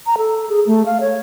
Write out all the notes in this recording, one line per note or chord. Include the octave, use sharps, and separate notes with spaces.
A#5
A4
G#4
A3
F5
C#5